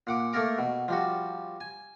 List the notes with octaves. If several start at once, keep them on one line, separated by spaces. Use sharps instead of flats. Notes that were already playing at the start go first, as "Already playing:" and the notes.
A#2 F#5 D6
A3 A#3 A4 A#4 D6
B2
F3 G3 F#4
G#5